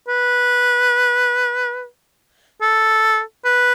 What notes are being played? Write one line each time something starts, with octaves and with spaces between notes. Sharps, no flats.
B4
A4
B4